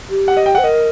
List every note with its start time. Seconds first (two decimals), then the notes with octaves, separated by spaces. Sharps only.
0.10 G4
0.28 F#5
0.37 D#5
0.46 G5
0.55 C5 F#5
0.64 A#4 D#5